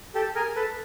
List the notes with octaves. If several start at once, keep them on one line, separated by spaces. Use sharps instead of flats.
G4 A4
G#4 A#4
A4 B4